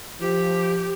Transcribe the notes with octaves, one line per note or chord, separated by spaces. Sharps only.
F3 G4